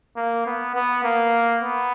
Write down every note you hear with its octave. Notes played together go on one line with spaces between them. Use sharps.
A#3
B3
B3
A#3
B3